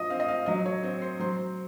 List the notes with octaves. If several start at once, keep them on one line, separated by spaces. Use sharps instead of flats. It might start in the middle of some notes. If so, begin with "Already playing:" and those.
Already playing: F3 D#5
C4 F5
D#5
F5
F#3 D#5
C#5
C4
C5
F#3 C5